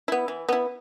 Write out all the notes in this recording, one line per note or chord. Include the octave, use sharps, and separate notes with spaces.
B3 E4
E3
B3 E4